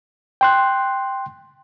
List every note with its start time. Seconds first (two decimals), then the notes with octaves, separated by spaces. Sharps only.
0.41 G5 C6 F#6